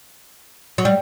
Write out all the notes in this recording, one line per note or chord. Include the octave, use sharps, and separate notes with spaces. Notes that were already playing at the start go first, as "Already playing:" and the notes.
F#3
G3